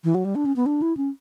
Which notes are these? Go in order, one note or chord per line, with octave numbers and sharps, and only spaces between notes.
E3
F#3
G3
D4
C#4
B3
D4
E4
C#4